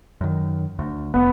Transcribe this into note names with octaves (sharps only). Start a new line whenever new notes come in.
F#2 D#3
D2
F1 B3